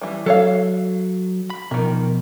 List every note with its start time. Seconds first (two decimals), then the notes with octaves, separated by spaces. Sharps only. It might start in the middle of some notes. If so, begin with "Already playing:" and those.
0.02 E3 G3
0.26 F#3 A4 C#5 F5
1.50 B5
1.71 B2 D#3 F3 A#4